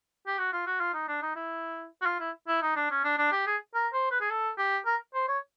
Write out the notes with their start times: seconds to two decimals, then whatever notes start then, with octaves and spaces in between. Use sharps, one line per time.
0.27 G4
0.38 F#4
0.53 F4
0.67 F#4
0.80 F4
0.94 D#4
1.08 D4
1.22 D#4
1.36 E4
2.02 F#4
2.06 F4
2.20 E4
2.48 E4
2.62 D#4
2.76 D4
2.91 C#4
3.04 D4
3.18 D4
3.32 G4
3.46 G#4
3.74 A#4
3.93 C5
4.11 B4
4.21 G#4
4.30 A4
4.58 G4
4.86 A#4
5.14 C5
5.28 C#5